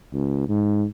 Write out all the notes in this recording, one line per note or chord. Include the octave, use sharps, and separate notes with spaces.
C#2
G#2